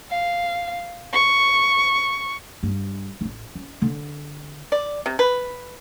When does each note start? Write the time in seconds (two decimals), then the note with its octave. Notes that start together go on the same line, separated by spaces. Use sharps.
0.10 F5
1.13 C#6
2.63 G2
3.21 A1 D#4
3.55 C#4
3.82 D3
4.72 D5
5.06 C3
5.19 B4